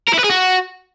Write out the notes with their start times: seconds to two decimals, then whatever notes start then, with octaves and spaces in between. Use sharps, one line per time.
0.08 A#4
0.14 E4
0.19 B4
0.24 G#4
0.30 F#4